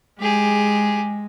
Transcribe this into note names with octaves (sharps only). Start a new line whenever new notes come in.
G#3 G4 G#4